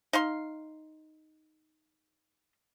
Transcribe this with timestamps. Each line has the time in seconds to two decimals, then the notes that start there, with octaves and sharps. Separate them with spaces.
0.13 D#4 F5 C6